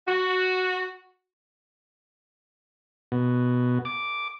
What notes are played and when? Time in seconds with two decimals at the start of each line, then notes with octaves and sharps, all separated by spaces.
0.08 F#4
3.12 B2
3.85 D6